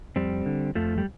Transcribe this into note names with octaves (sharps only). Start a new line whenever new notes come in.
F2 G3 C4
D3
F2 F3 A3
G3